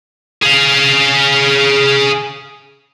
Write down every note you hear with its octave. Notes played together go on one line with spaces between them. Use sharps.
G#4 F5